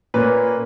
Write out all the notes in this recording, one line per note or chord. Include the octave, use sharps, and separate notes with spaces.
A#2 A#3 C#4 B4